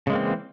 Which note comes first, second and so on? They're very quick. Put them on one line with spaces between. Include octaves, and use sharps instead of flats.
C#3 G#3 A#3 C4 E3